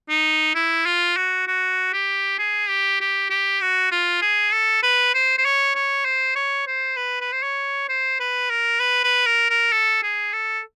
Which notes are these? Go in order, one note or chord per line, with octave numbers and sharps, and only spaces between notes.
D#4
E4
F4
F#4
F#4
G4
G#4
G4
G4
G4
F#4
F4
G#4
A4
B4
C5
C5
C#5
C#5
C5
C#5
C5
B4
B4
C5
C#5
C5
B4
A#4
B4
B4
A#4
A#4
A4
G#4
A4